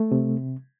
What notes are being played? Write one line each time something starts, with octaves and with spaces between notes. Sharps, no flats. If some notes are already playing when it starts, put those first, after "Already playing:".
Already playing: A3
C3